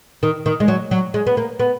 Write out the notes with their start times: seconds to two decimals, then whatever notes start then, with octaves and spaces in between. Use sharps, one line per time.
0.23 D#3
0.46 D#3
0.60 G#3
0.68 F#3
0.91 F#3
1.14 G#3
1.26 B3
1.37 A#3
1.59 B3